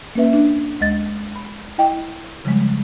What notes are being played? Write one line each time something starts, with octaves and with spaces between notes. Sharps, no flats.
A#3 C#4 B4 E5
D4
D2 G#3 D#5 A6
B5
E4 D#5 G5
C#3 F3 G3 G#3